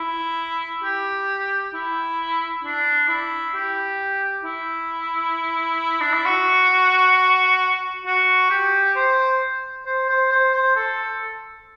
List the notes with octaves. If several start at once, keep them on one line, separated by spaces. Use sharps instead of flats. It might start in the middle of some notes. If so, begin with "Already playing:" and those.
Already playing: E4
G4
E4
D4
E4
G4
E4
D4
E4
F#4
F#4
G4
C5
C5
C5
C5
C5
A4